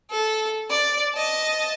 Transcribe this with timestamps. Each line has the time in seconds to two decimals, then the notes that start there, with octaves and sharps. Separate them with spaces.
0.11 A4
0.70 D5
1.14 D#5 A5